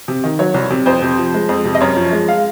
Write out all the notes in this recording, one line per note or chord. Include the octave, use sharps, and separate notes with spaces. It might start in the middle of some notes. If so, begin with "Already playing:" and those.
C3
D#3
F#3 C#5
C2
C3
F2 C5
C3
F3
G#3
F2
C3
D#5
F#2 C#5
F3
G#3
F5